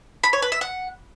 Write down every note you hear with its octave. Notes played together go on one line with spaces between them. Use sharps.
B5
C#5
B4
E5
F#5